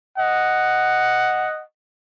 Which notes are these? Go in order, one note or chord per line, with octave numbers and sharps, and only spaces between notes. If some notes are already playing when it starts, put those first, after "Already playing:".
D#5 F#5